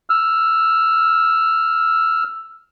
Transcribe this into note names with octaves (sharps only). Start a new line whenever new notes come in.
E6 F6